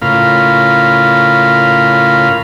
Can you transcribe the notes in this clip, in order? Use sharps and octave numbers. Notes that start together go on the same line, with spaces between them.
A2 C#3 F4 A#4 F5 B5